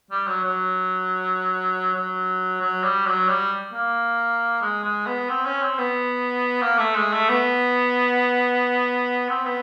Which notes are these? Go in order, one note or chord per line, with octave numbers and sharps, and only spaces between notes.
G3
F#3
F#3
F#3
F#3
G3
F#3
G3
A#3
G#3
G#3
B3
C4
C#4
C4
B3
A#3
A3
G#3
A3
B3
C4
B3